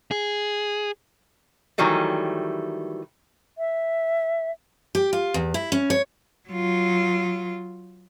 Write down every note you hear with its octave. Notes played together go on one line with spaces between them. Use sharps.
G#4
D#3 E3 F#3 G3 A3
E5
G4
F4
E2
E4
C#4
C#5
F#3 F4